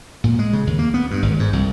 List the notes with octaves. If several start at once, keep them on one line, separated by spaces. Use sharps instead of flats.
A#2
G#3
C#3
D#2
A#3
B3
G2
G#1
G#2
C2